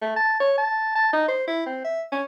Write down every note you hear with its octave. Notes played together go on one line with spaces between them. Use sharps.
A3
A5
C#5
A5
A5
D#4
C5
E4
C4
E5
C#4